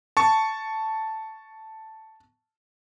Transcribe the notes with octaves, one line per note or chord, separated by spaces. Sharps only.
A5 C#6